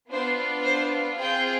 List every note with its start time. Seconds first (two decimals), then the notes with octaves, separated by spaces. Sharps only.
0.10 B3 D4 F4 C5
0.64 C5
1.18 C4 F4 G#4 G5